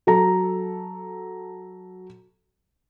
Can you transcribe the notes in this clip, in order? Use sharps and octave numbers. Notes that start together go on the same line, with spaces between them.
F#3 A4 A#5